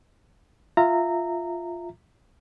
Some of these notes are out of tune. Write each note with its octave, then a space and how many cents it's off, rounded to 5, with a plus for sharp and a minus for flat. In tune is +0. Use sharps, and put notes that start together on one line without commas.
F4 +0 E5 +0 A#5 -20